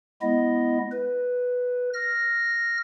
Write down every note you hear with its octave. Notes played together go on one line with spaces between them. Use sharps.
G#3 B3 E4 D#5
B4
F6 A#6